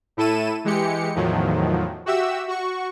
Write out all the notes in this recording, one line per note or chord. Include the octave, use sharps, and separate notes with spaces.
A2 E4 A4 D#7 E7
E3 G#3 G4 C#7
E2 A2 D#3 F3 F#3
F#4 G4 E5 E6
F#4 C#6